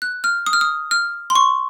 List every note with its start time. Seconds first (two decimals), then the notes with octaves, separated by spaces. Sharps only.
0.02 F#6
0.24 F6
0.46 D#6
0.53 F6
0.61 D#6
0.91 F6
1.30 C6
1.35 C#6